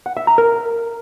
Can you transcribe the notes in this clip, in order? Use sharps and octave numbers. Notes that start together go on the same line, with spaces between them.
F#5
E5
A#5
A#4